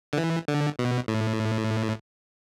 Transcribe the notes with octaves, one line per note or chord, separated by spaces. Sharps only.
D3
E3
D3
B2
A2